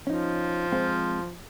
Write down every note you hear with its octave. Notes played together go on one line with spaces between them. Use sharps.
F3 C#4 D#4
G#3 C4 F4